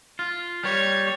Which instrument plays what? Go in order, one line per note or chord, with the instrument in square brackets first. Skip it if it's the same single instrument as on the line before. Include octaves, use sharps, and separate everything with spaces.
[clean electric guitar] F4
[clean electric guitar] G3 [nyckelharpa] C#5